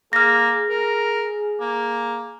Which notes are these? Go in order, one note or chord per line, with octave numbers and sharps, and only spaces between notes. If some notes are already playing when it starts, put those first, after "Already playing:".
A#3 G#4 F6 A#6
A#4
A#3